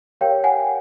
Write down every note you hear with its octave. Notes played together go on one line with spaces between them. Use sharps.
G4 A#4 C#5 F5 G5
F#5 G#5